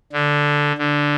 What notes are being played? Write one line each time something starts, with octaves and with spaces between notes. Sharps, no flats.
D3
D3